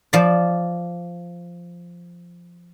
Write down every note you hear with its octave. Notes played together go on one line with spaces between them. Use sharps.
F3 D5